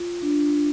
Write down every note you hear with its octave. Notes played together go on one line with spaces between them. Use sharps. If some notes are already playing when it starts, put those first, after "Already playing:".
Already playing: F4
D4